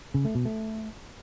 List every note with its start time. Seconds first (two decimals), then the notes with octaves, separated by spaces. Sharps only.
0.14 C#3
0.25 A3
0.35 B2
0.45 A3